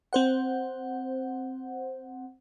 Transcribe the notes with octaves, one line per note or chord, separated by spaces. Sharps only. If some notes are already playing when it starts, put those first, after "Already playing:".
C4 C5 F#5